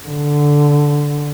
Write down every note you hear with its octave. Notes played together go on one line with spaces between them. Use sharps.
D3